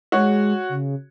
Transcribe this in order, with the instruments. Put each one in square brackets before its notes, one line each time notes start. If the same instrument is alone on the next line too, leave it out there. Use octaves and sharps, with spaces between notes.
[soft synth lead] G#3 [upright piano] F#4 C#5
[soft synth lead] C#3